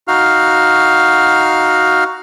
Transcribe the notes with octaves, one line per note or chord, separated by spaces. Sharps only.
D#4 F#4 F5 F6